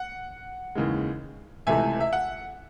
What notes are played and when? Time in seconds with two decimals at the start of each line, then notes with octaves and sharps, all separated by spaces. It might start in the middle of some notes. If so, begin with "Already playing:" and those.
Already playing: F#5
0.75 D#2 C#3 E3 G#3
1.67 C#2 C3 E3 A3 E5 G#5
2.00 E5
2.13 F#5